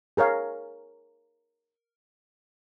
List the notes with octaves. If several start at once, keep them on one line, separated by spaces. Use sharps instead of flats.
G#4 A#4 C#5 F5